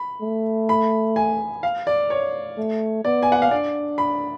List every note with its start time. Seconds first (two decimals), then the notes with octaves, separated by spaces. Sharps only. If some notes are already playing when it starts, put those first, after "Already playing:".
Already playing: B5
0.21 A3
0.69 B5
1.16 G#5
1.63 F5
1.87 D5
2.10 C#5
2.57 A3
3.04 B3 D5
3.23 G#5
3.32 F#5
3.42 F5
3.51 D4 D5
3.98 B5